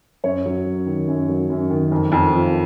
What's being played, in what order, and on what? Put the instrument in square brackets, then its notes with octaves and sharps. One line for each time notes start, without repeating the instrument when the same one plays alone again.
[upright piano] F#2 C#5
F#3
F#2
D#3
F#2
F#3
F#2
D#3
F2
F2
F3